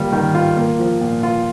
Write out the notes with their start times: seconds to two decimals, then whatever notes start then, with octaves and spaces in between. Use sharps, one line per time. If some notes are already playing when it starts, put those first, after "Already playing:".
Already playing: D#3 G3 A#3 F4
0.12 D#3
0.35 F4
0.57 A#3
0.79 F3
1.01 A#2
1.23 F4